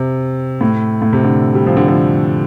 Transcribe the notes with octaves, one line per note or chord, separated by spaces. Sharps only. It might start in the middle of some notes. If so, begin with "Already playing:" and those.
Already playing: C3
A2
A2
C3
D3
G3
F3
D3
F3